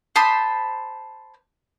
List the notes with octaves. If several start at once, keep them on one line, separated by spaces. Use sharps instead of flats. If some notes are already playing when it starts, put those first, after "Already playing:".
C5 A5 B5 D#6